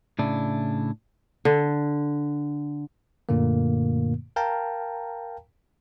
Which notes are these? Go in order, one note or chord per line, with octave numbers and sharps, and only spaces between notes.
A2 C#3 D4 E4
D3
F#2 A#2 D3 A3 A#3
A#4 F5 G5 A5 A#5